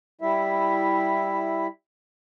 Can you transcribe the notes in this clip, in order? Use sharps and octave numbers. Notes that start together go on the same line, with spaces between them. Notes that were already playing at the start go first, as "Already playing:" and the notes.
G3 E4 E5